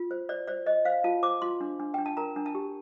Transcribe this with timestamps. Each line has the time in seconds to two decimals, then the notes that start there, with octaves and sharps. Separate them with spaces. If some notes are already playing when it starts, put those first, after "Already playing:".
Already playing: F4
0.11 C5
0.29 C5 D5
0.48 C5 D5
0.66 C5 D#5
0.85 C5 F5
1.04 F4 A5
1.23 C5 D6
1.42 F4 C6
1.61 D4
1.80 D4
1.94 D4 G5
2.06 A5
2.17 A#4 A#5
2.36 D4
2.46 A5
2.55 G4